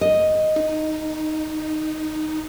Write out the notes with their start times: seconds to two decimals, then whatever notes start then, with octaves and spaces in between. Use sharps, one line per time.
0.01 D#5
0.56 D#4